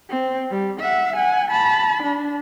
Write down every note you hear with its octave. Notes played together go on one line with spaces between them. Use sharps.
C4
G3
E5 F#5
F#5 G#5
A5 B5
D4